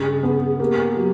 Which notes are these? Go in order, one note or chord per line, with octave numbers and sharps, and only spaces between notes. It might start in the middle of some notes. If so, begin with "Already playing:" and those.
Already playing: G2 C#3 G#4
B3
A#3 G4
F#3 G4